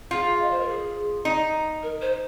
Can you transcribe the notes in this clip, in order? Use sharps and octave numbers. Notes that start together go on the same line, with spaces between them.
F4 G#4
F5
D#5
C5
A#4
G#4
D#4
A#4
C5